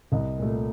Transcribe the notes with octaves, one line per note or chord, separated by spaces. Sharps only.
C2 D#5
A#2 A3